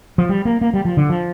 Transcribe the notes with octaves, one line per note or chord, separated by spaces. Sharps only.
F3
G3
A#3
A#3
G3
F3
D3
F3